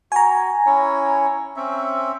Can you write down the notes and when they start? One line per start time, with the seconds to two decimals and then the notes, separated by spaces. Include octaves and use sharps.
0.12 F#4 G#5 A#5
0.66 C#4 E4 C#5
1.56 C4 C#4 E5